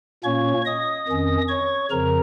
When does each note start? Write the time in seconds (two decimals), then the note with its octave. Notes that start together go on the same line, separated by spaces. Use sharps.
0.24 A#2 A#3 C#4 C#5 C#6
0.65 D#5 D#6
1.08 F2 D#3 C#4
1.48 C#5 C#6
1.90 F2 C#3 F3 A#4 A#5